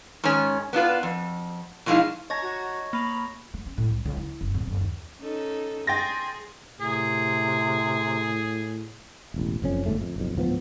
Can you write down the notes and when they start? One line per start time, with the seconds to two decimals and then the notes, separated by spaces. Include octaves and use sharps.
0.24 G#2 D#3 C#4
0.73 B3 D4 F4 B4
1.03 F2
1.86 B2 F3 G#3 D#4 E4 F5
2.30 C#5 D#5 A5 A#5
2.42 F#4
2.93 A#3 B5 F7
3.54 A3
3.66 C#4
3.77 A2
3.90 C2
4.05 C#2
4.17 E4
4.41 F#1
4.54 D1
4.67 F#1
4.81 D#2
5.19 C#4 D#4 A4
5.87 G#4 G5 C6 A6 A#6
6.80 A2 C3 G#4
9.34 E1 A1
9.62 F#1 F2 C#4
9.86 G1 C#2 G#2 A3
10.01 F2
10.16 F#1 B1 F2
10.35 D1 G#2 F3 B3